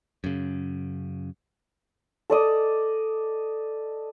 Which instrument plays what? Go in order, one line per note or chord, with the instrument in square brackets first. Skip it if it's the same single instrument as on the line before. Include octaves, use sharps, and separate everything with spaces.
[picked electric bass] F#2 C#3
[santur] A4 D5 D#5